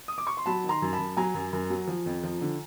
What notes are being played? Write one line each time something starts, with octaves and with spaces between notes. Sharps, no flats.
D#6
D6
C#6
C6
F#3 A5 B5
D#3
A#5 C6
F#2
A5 B5
F#2
F#3 G#5 A#5
F#2
F#2
F#3
F3
F2
F3
D3